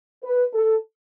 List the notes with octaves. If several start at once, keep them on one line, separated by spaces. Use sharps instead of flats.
B4
A4